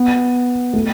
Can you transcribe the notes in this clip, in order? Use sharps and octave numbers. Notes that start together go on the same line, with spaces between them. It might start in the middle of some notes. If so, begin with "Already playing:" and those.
Already playing: B3
A3